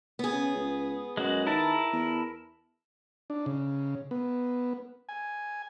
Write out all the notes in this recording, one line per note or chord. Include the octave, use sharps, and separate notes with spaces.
B3 G#4
C#3
C#2
F#2 G#3 F#4
D#3 E4 A#4 A5
E2
D4
C#3
B3
G#5